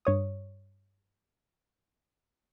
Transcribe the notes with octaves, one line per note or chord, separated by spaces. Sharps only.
G2 C#5 D#6